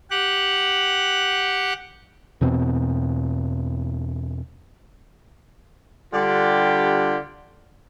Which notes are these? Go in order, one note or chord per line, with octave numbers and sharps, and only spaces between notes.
G4 F#5 F#6
E2 B2 C4
D3 G3 D4 F4 G4